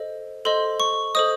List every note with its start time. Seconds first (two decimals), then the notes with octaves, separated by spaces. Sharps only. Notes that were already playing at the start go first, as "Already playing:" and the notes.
Already playing: A4 C5 D#5
0.45 A4 C5 D#5 C6
0.80 C#6
1.15 A4 C5 D#5 D#6